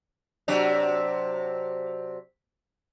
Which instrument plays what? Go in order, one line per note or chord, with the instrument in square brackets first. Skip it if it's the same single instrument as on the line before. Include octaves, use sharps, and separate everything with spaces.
[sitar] C3 F#3 D4